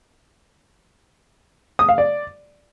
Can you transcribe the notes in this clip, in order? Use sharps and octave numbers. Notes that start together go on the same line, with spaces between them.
D#6
F5
D5